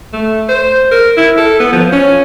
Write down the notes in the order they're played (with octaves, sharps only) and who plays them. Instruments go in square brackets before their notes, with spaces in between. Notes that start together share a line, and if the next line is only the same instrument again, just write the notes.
[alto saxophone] A3
C5
A#4
E4
A4
B3
F3
C#4